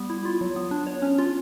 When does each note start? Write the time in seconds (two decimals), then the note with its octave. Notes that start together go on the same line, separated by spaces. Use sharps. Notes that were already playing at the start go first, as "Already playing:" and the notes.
Already playing: G3 B3 G4
0.10 E4
0.25 F4
0.41 F#3
0.56 B3
0.71 D4
0.87 C#5
1.02 C#4
1.19 F4